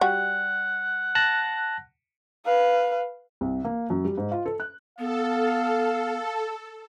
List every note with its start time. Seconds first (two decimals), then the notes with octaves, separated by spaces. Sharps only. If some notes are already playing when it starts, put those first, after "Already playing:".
0.01 G3 F#4 F#5
1.15 A5 F#6 A#6
2.45 B4 F5
3.41 C2
3.65 A#3
3.90 F#2
4.05 G3
4.18 G#2
4.32 F4
4.46 A4
4.60 F#6
4.98 B3 A4 F5